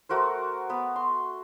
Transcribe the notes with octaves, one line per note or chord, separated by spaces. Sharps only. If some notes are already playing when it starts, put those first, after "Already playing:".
A3 F#4 A#4 C5
B3 B5
C6